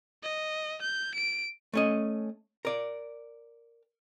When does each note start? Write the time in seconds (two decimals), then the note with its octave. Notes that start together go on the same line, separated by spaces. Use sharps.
0.23 D#5
0.82 G6
1.15 D7
1.73 A3 C#4 D#5
2.65 A#4 D5